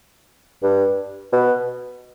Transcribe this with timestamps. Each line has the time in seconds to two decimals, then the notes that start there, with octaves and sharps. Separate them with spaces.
0.63 G2
1.32 B2